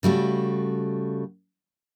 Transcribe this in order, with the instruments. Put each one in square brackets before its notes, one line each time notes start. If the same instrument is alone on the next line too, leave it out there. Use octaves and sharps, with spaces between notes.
[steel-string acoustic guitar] C#3 G3 A3 F#4